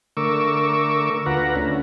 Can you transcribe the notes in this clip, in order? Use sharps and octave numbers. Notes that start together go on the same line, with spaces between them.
D3 A3 A#4 C#6 D6 E6
D2 F4 B4 F#5 A#5
A3 C#4 D4